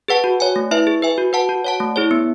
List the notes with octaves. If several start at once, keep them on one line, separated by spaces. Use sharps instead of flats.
G#4 B4 F#5 A5
F#4
C#5 G#5
A3
E4 B4 E5
G#4
B4 E5 G#5
F#4
B4 F#5 A5
F#4
C#5 F#5 A5
A3
E4 G#4 C#5
B3